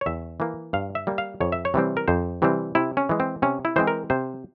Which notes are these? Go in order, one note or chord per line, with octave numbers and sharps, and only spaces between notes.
C#5
E2 E5
E3 A#3
G2 F5
E5
G3 A#3
F5
F2 C#5
E5
C#5
C3 E3 G3 C4
A#4
F2 C5
C3 E3 G3 C4
C3 E4
C#4
E3 G#3
C4
C3 C#4
E4
E3 G#3 C4 C5
A#4
C3 C5